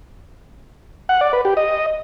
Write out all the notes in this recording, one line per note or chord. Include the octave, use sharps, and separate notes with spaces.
F#5
D5
B4
G4
D#5